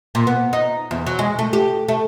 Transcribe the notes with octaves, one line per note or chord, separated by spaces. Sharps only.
A#2
B3
D#4
E2
F#3
G#3
A3
G4
A3